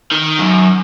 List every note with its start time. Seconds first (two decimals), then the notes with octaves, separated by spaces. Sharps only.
0.11 D#3
0.39 F#2